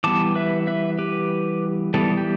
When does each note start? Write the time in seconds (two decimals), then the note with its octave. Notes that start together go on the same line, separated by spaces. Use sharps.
0.04 E3 G3 B3 A5 D6
0.35 B4 E5
0.67 B4 E5
0.99 G4 B4
1.94 E3 G3 B3 A4
2.17 G4